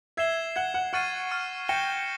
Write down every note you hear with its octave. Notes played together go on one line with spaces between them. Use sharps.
E5 G#6 C7 E7 G7
F#5 G#6 C7 E7 G7
F#5
F#5 C#6 F6 A6 C7 D#7
C#6 F6 A6 C7 D#7
G5 G6 A#6 C#7 E7 G7